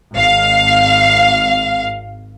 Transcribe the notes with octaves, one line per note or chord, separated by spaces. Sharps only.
G#1 F5